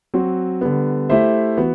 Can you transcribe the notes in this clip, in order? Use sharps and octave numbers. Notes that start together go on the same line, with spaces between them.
F#3 C4 F#4
D3 G3 B3
A3 E4 G4 C5 E5
E3 B3 F#4